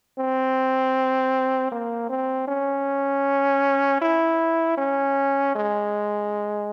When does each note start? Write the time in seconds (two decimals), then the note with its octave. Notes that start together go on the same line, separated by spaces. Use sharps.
0.19 C4
1.72 A#3
2.09 C4
2.48 C#4
4.02 E4
4.78 C#4
5.55 G#3